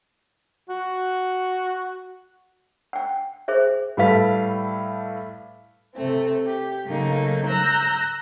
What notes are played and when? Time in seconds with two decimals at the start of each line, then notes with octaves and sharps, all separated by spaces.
0.69 F#4
2.93 F#5 G5
3.48 G#4 C5 E5
3.97 A2 G3 A4 B4 F5 B6
5.94 C3 A3 C4
6.46 G4
6.87 C#3 F#3 A3 A#3 D#4
7.45 A#5 E6 F#6 G6